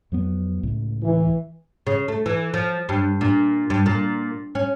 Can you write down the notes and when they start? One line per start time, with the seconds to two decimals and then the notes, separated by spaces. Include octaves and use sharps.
0.12 F2 F#3 B3
0.63 C#2 A2
1.03 E3
1.87 C#3
2.08 A3
2.26 E3
2.54 F3
2.89 G2
3.21 A#2
3.70 G2
3.86 A#2
4.55 C#4